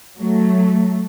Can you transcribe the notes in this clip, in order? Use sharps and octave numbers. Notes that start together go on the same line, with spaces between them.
F#3 A3